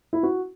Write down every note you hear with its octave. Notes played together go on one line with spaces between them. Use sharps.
E4
F#4